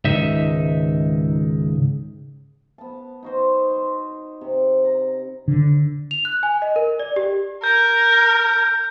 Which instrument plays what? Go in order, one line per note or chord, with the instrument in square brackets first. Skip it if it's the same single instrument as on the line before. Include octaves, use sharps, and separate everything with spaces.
[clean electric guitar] C#2 G#2 D#3 D#4 E5
[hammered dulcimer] B3 A5
D#4 F#4 C5
C6
C3
A#5
[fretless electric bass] D3
[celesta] F7
F#6
G#5
D#5
A#4
D5
G4
[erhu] A#4 [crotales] G6